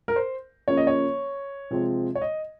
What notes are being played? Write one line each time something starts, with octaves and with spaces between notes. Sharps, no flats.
A#4
C5
C#3 F3 A#3 C#4 C#5
D#5
C#5
C3 F3 G#3 C4
C#5
D#5